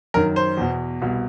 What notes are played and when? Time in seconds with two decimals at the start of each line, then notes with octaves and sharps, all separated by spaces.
0.14 F#2 D#3 A#4
0.36 C5
0.57 E2 B2
1.02 C2 B2